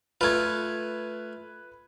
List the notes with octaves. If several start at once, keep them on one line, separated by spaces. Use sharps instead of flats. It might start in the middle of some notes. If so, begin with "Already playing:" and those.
A3 F4 B4 G#6